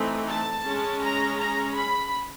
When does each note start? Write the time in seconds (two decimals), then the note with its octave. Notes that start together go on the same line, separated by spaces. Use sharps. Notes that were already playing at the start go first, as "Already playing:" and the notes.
Already playing: E3 A3 C4 D#4
0.28 A5
0.65 G#3 C#4
1.02 A#5
1.39 A#5
1.76 B5